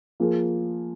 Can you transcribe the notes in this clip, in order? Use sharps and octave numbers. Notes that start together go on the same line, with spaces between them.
F3 A#3 F4 G#4